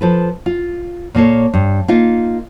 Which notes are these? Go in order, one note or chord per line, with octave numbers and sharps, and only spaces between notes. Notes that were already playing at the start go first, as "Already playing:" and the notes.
F3 A4 B4
F4
A#2 A#3 A4 C#5
G2
A#3 D#4 F4